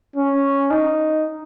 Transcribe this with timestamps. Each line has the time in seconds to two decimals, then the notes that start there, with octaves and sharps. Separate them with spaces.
0.16 C#4
0.71 D#4